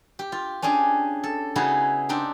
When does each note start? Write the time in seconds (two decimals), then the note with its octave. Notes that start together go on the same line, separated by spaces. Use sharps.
0.19 G4
0.32 F4
0.62 C#4 D4 G4 G#4
1.24 A4
1.56 C#3 B3 D#4 E4 F#4 G#4
2.09 C4 D4 D#4 G4